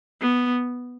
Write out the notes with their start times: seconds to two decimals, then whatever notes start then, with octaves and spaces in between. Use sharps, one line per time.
0.21 B3